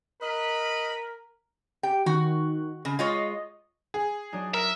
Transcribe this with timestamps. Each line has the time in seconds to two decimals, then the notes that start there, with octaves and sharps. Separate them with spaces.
0.22 A#4 B4 D#5 B5
1.83 G4 G5
2.06 D#3 F#4
2.85 C#3
2.99 G#3 F4 C#5 D#5
3.94 G#4
4.33 F#3 D4 D#4
4.54 A#4 E5